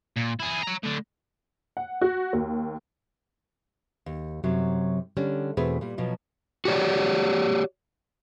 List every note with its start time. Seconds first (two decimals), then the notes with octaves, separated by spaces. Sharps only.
0.17 A#2
0.40 E4 G#4
0.63 C#5 A#5
0.84 A2 D3
1.77 F#5
2.01 F#4
2.33 D#2
4.06 D#2
4.44 F#2 C3 F#3
5.17 D3 G3 C#4
5.57 E2 B2 A3 C4 G#4 B4
5.81 A#2 G3
5.98 B2 F3 F#3
6.65 F#4 G4 C#5 D5